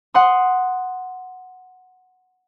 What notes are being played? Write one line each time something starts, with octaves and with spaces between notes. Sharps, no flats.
F#5 C6 D#6